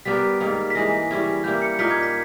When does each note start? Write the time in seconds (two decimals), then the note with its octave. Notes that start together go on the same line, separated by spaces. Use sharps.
0.05 G3 B3 G4 A#4 B6
0.40 G#2 D#3 G3 A#3
0.70 B6
0.75 E3 G#3 D#4 A#6
1.11 E3 G3 C#4 E4
1.44 G3 A#3 E4 G6
1.62 C#7
1.79 A#2 A#3 D#4 A#4 B6
1.90 G#6
2.03 B6